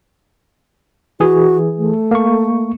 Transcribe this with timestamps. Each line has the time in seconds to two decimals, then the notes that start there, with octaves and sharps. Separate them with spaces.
1.20 E3 F#4 G#4
1.78 A3
2.11 A#3 C#6